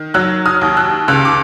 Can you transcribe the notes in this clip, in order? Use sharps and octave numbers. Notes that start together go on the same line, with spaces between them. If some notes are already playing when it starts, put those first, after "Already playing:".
Already playing: D#3
F#3 E6 F#6
D#6 F6
D#2
E6 F#6
C#2 E6 F#6
D6